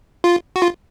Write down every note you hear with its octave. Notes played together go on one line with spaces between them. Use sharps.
F4
F#4
F4